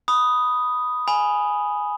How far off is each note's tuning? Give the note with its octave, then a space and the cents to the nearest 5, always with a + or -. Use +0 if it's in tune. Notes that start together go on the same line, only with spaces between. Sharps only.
B5 +0 D#6 +0
G#5 +0 B5 +0